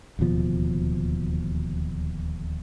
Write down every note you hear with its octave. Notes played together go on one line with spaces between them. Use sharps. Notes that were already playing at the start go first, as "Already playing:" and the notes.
D1 D#2 B2 F3